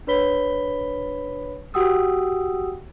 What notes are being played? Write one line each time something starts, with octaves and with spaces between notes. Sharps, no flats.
D4 B4 C#5 B5 B6 G7
F#4 G4 F#5 G5 D#6 E6